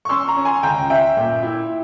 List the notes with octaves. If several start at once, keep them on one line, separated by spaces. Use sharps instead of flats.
C#6
C#4 C6 E6
A#5 C#6
C#4
G#5 C6
C#2 G5 A#5
C#4 E5 G5
A#2
E4